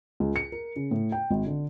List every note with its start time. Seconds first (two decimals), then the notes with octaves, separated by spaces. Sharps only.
0.20 C#2
0.36 C#7
0.52 A#4
0.76 C#3
0.91 A2
1.12 G5
1.30 G#1
1.46 D3